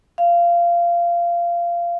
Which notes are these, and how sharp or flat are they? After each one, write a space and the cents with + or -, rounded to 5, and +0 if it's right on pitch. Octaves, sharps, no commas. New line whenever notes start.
F5 -20